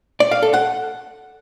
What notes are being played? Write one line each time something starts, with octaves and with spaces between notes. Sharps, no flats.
D5
F5
A4
F#5